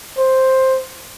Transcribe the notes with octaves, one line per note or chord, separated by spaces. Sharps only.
C5